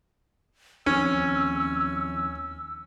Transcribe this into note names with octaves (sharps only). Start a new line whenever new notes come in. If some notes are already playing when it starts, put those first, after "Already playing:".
D#2 F3 C4 C#4 E6